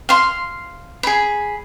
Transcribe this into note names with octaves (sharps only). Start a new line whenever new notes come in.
F5 C6
G#4 B5